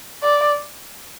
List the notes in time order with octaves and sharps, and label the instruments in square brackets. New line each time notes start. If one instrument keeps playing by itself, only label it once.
[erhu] D5